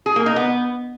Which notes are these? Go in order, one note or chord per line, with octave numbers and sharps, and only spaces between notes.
G#4
A#3
D#4
B3